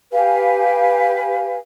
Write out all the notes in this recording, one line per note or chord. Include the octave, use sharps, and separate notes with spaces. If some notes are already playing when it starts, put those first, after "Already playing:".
G4 B4 F5 G#5